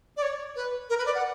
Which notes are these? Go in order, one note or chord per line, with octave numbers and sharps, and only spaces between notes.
D5
C#5
B4
A#4
B4
D5
F#5